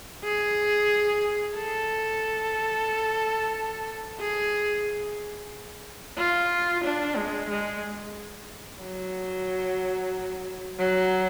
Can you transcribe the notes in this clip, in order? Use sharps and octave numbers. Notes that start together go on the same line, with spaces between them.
G#4
A4
G#4
F4
D4
G#3
G#3
F#3
F#3